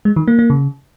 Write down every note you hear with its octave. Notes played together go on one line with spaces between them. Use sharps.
G#3
D#3
A#3
A#3
C#3